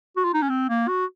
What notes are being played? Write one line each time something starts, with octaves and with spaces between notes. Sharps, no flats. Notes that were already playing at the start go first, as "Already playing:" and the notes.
F#4
F4
D#4
C#4
C4
A#3
F#4